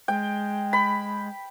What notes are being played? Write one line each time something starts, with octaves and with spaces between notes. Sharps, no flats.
G#3 G5
B5